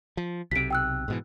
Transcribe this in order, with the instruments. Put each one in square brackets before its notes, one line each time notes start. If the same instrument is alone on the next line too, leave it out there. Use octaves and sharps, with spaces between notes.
[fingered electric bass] F3
[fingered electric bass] B1 C3 [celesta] B6 D7
[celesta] G5 E6 F#6
[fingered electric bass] G#2 B2 E3